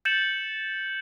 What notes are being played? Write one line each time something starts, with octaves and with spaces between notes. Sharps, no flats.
G6 A6 C#7 E7 F#7